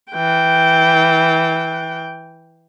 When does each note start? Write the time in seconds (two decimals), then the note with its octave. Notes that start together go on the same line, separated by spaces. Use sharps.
0.12 E3 G5